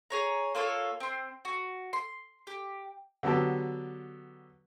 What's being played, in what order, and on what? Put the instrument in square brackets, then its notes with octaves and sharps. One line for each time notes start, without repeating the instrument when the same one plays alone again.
[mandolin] G#4 C#5 A#5
A#3 F4 A4 C#5
C4 C6
F#4
C6
G4
[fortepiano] D3 F#3 B3 G4 A4 A5